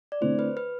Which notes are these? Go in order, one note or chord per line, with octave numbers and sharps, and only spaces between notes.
D5
D3 A3 C4 E4 C5
B4
B4